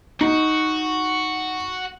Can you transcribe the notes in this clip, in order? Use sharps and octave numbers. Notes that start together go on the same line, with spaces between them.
D#4 F#4